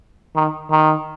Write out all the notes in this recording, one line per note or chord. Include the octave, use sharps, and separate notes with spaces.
D#3
D#3